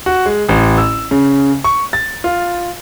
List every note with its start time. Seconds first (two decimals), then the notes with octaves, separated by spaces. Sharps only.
0.06 F#4
0.26 G#3
0.49 A1
0.78 E6
1.11 C#3
1.64 C#6
1.93 A6
2.24 F4